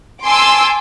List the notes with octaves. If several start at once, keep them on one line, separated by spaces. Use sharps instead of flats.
G#5 A5 C6 D6 E6